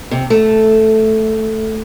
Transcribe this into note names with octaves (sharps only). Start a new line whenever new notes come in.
C3
A3